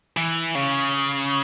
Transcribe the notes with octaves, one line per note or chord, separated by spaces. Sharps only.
E3
C#3